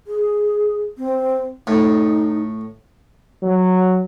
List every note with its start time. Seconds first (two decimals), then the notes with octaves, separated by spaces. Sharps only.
0.07 G#4
0.98 C4
1.67 A2 D#4
3.43 F#3